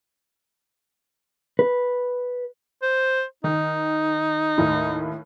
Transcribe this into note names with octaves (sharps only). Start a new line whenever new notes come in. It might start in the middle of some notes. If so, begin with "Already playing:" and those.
B4
C5
D#3 D#4
D#2 A2